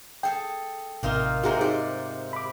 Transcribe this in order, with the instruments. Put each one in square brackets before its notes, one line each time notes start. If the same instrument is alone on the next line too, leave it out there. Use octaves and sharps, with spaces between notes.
[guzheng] G#4 A4 [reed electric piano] G5
[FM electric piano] A1 C3 F6 [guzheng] A#3 D#4 F4
[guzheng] G#2 C3 C4 [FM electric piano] F#4 G#4 A#5
[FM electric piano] D#4 [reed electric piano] G4 [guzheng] D5
[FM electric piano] B5 D6